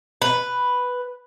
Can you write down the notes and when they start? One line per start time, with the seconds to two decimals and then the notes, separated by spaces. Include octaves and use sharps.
0.22 B4